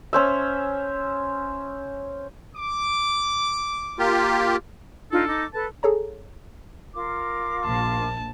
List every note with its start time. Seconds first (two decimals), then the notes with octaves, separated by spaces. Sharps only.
0.13 C#4 C5 E5
2.56 D6
3.99 A#3 F4 G4
5.11 D4 D#4 F4 A4
5.27 D#4 D6
5.54 A4 B4 A5
5.83 G#4 A4 C#5 A#5
6.93 F4 A#4 D6
7.66 A#1 A5